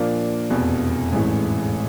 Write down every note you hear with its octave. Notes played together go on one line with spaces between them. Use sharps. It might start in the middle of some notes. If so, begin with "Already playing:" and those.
Already playing: A#2 F3 A#3 D4
F1 E2 B2
A1 G#2 E3 A3